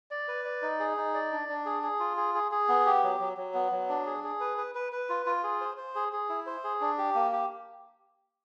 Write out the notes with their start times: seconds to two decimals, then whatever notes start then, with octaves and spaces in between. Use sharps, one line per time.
0.11 D5
0.28 B4
0.45 D5
0.62 D#4
0.80 G#4
0.97 D#4
1.14 D5
1.32 D4
1.48 D4
1.65 G#4
1.83 G#4
2.00 F4
2.17 G#4
2.35 G#4
2.52 G#4
2.69 B3
2.86 G4
3.03 F#3
3.20 F#3
3.37 F#3
3.54 B3
3.72 F#3
3.89 D4
4.06 G#4
4.24 G#4
4.40 B4
4.58 B4
4.75 B4
4.92 B4
5.09 F4
5.26 F4
5.44 G#4
5.61 C5
5.77 C5
5.95 G#4
6.13 G#4
6.29 E4
6.46 C5
6.64 G#4
6.81 D4
6.98 G4
7.15 A#3
7.33 G4